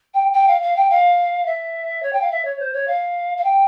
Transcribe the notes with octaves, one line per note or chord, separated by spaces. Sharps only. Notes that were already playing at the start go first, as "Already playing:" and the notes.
G5
G5
F5
F5
G5
F5
E5
C#5
G5
F5
E5
C#5
C5
C#5
F5
F5
G5